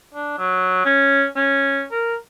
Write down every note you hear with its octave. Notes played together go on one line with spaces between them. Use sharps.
D4
F#3
C#4
C#4
A#4